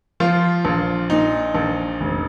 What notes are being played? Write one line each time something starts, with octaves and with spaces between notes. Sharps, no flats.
F3 F4
A#1
A#2 D#4
A#1
F1